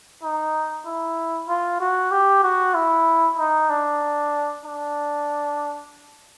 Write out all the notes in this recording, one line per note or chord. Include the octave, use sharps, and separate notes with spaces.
D#4
E4
F4
F#4
G4
F#4
E4
D#4
D4
D4